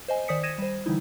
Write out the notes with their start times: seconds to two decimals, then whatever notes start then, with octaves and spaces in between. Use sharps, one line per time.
0.08 C5 D#5 G#5
0.28 D#3 C5 D5 D#6 B6 C#7
0.43 D#6 G#6 A#6 D#7 E7
0.58 G3 C5
0.86 D3 E3 G3 D#4 E4